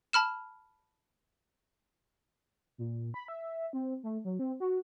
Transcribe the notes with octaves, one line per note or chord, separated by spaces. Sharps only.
A5 B5 F6 E7
A#2
B5
E5
C4
A3
F#3
C4
F#4